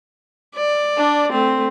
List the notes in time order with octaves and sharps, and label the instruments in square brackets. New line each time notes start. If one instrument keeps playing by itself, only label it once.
[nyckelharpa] D5
[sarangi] D4
[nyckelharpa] A3 [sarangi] C4